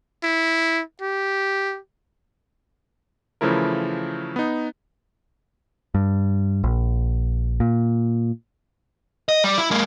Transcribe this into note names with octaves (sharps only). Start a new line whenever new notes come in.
E4
G4
C#3 E3 F3 A3 E4 A#4
B3 D#4
G2
A#1
A#2
D#5
G3
E4
G#3 A#3